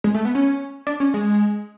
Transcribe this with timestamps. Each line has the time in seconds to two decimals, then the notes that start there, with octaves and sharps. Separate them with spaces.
0.04 G#3
0.14 A3
0.25 B3
0.35 C#4
0.87 D4
1.00 C#4
1.14 G#3